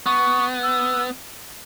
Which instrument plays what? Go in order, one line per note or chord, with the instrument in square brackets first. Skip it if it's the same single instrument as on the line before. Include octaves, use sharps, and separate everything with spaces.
[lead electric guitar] B3 [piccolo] C#6
[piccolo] E6